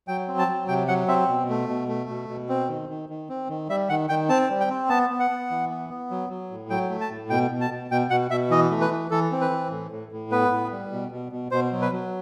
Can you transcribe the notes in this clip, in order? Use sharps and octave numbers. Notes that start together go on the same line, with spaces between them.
F#3 G5
C4
A5
F#3
C3 G5
F#3 F#5
C4 E5
B2
A3
B2
A3
B2
B2
C4
D#3
D#3
D#3
C4
D#3
G3 E5
D#3 F#5
D#3 G5
C4 A5
G3
G5
C4
B3 A5
B3
F#5
B3
E3
B3
B3
F#3
F#3
A2
F#3 G5
A3
A5
A2
B2 G5
B2
A5
B2
B2 G5
B2 F#5
B2 E5
E3 D#5
A3
B4
E3
E3 A4
C4
B4
E3
A2
A2
A2
B3 B4
A2
G3
B2
B2
B2
B2 C5
F#3
B4
F#3